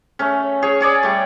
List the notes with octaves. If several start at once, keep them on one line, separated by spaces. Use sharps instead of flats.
A3 C#4
G#4 C#5
G#4 C#5 D5
G3 A3